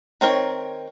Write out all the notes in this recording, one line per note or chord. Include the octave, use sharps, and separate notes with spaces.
D#3 C4 A#4 C#5